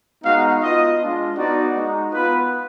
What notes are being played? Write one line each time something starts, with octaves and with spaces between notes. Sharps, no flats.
G#3 B3 D#4 F#4 F5
B3 F4 D#5
G#3 D4 F4
B3 D#4 F#4 D5
G#3 D#4 F#4
B3 F4 B4